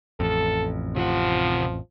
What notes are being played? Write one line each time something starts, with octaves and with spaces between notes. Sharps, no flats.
A1 F2 A4
C3 F3 F4 F#5